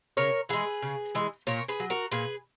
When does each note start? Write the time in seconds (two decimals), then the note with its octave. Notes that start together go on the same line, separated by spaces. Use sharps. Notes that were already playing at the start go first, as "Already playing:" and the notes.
0.17 C#3 A#4 C#5
0.49 E3 G#3 G#4 B4
0.82 C#3
1.15 E3 G#3
1.47 A#2 A#4 C#5
1.68 G#4 B4
1.80 F#3
1.90 F#4 A#4
2.12 A#2 G#4 B4